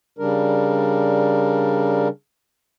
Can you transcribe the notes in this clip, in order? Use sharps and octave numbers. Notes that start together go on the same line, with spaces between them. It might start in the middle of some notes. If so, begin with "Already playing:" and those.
C#3 G3 D4 A#4